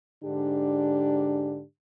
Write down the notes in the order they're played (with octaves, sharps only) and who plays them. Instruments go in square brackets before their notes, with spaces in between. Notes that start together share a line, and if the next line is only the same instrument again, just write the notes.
[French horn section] G#2 D3 D4 G4